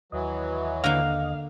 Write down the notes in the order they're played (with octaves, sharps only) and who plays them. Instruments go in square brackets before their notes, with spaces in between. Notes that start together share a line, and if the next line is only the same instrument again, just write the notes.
[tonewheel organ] D#2 D#5 [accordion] E3 F#3
[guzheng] D3 A#3 [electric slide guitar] F5